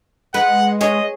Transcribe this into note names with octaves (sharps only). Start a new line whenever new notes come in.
G#3 B4 F#5
G#4 C#5 D#5